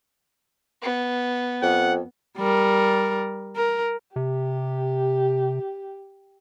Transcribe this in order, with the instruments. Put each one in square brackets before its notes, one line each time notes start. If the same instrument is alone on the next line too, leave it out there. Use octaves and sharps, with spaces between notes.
[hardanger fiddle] B3
[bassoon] F2 [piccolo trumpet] F#5
[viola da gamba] G3 A#4
A#4
[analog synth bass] C3 [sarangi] G4